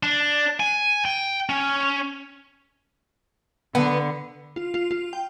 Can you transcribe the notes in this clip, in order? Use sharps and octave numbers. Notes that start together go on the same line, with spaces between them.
D4
G#5
G5
C#4
D3 B3
F4
F4
F4
G5